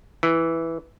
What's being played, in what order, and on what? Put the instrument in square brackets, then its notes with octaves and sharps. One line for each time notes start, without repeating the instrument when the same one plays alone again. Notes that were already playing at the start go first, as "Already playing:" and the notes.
[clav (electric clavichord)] E3